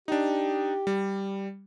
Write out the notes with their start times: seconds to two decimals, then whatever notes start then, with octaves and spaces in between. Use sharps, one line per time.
0.08 D4 D#4 G4
0.87 G3